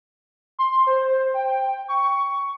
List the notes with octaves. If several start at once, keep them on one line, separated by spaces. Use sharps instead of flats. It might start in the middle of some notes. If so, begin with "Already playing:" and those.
C6
C5
G5
C#6